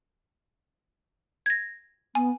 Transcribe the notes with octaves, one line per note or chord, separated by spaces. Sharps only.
G#6 A#6
B3 G#5